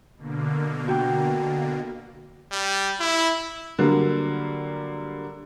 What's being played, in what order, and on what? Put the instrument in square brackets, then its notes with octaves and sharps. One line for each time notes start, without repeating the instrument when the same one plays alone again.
[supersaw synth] B2 D3 A#3
[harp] F#4 G5
[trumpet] G3
E4
[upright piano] D3 F#3 G3 A#3